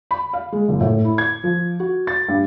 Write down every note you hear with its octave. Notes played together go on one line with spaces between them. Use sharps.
B5
F5
G#3
F#1
A2
E4
G#6
F3
F#4
A6
G2